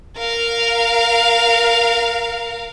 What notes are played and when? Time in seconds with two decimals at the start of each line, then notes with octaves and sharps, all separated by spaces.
0.18 A#4 F5